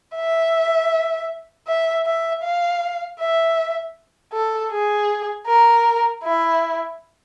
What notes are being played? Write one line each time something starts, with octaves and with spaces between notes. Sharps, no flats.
E5
E5
E5
F5
E5
A4
G#4
A#4
E4